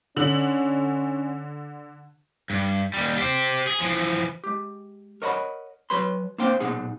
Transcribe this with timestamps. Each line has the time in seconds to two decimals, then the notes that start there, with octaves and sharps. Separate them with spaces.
0.16 D3 C#4 F#7
2.50 G2
2.94 D#2 G3
3.18 G4 C5
3.67 G#4
3.80 E3 F3
4.44 G#3 G4
5.22 A#4 C#5 D#5 F#5 A#5 B5
5.90 F#3 F#4 B4 C#5 B5 C6
6.38 A#3 C4 D4 C5 F5 G5
6.60 B1 A#2 B3 D#4 G#4 F#5